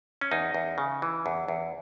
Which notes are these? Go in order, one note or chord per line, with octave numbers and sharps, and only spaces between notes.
C#4
E2 D#4
E2
C#3
E3
E2
E2